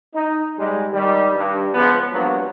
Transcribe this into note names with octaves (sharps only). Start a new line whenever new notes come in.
D#4
G#2 G3 G#3
D#3 G3
G2
C#2 C#3 F3 B3
G2 F3 F#3 A#3 B3